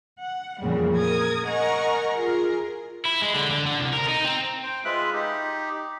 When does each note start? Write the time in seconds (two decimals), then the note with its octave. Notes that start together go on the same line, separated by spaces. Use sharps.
0.19 F#5
0.61 F2 A#2 C#3 E3 G3
0.93 A#4 D#6 G#6
1.45 A#4 D#5 F#5 G#5 A#5 C#6
2.14 F4 G#4 A#4
3.05 E4
3.22 G#3
3.35 D3
3.50 D3
3.66 D3
3.80 C2
3.93 A#4
4.09 D#4
4.25 C4
4.63 C5 G5
4.85 G#3 F4 B4 E5 F#6
5.13 D#4 G4